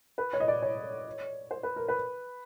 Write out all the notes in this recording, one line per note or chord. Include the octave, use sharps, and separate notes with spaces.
B4
C#5
D#5
D5
C#5
C5
B4
A#4
B4